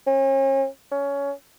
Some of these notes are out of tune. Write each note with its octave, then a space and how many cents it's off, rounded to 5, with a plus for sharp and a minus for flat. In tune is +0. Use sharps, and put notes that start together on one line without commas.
C#4 -40
C#4 +20